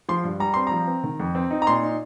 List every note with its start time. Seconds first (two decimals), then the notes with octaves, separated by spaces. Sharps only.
0.09 F3 C6
0.24 G2
0.40 G3 A#5
0.54 C4 C6
0.67 F3 A#5
0.88 C4
1.04 D#3
1.20 F2
1.35 C4
1.51 D#4
1.62 A#5
1.67 A#2 C6
1.83 D#4